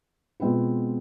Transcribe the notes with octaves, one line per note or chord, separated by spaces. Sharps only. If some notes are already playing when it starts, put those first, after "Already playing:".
B2 G#3 C4 F4 B4